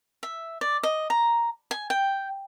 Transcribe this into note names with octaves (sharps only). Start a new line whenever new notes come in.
E5
D5
D#5
A#5
G#5
G5